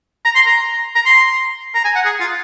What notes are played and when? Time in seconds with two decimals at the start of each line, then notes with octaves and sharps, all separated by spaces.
0.25 A#5
0.35 C6
0.46 A#5
0.96 A#5
1.05 C6
1.75 A#5
1.85 G#5
1.95 F#5
2.05 G#4
2.20 F4